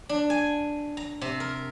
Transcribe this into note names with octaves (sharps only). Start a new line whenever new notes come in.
D4
G#5
A#5
C3
A#4